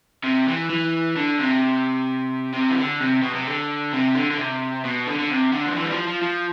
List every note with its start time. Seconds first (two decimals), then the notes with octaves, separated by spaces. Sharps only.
0.24 C3
0.47 E3
0.70 E3
1.16 D3
1.39 C3
2.54 C3
2.71 E3
2.78 D3
3.00 C3
3.22 B2
3.34 C3
3.46 D3
3.93 C3
4.15 D3
4.31 D3
4.38 C3
4.85 B2
5.07 D3
5.20 D3
5.31 C3
5.53 D3
5.67 F3
5.76 E3
5.85 G3
5.92 F3
6.08 F3
6.22 F3